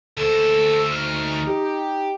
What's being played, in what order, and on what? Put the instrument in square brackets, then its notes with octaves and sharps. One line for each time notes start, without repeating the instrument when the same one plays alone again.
[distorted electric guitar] D2 C5 [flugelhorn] A4 [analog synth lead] E6
[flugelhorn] D#4 [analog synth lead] F6
[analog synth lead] G4